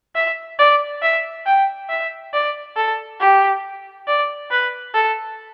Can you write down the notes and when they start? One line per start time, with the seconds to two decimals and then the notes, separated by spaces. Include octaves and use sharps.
0.15 E5
0.59 D5
1.02 E5
1.46 G5
1.89 E5
2.33 D5
2.76 A4
3.20 G4
4.07 D5
4.51 B4
4.94 A4